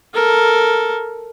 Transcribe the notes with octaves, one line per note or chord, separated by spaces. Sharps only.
A4 A#4